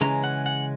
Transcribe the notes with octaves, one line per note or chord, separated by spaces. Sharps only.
C#3 E3 G#3 C#4 A#5
F#5
F#5